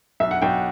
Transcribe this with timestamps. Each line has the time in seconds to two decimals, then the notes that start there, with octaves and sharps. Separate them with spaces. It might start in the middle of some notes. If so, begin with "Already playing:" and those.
0.20 B1 E5
0.31 F#5
0.42 B1 G5